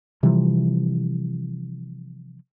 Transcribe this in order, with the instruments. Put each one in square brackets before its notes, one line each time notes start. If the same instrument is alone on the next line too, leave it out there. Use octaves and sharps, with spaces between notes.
[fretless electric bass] C3 E3 F3 G3